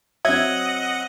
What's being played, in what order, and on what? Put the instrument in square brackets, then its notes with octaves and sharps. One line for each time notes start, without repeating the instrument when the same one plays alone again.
[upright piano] F#3 C4 [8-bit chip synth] D#5 F#5 [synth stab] E5 G#6